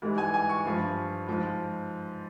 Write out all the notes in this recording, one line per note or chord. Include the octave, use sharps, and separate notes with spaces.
G#2 E3 G3
G#5
G#5
C#6
G2 F3
G#2 F3